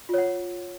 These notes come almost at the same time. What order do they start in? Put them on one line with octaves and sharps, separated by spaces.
F4 C#5 F#5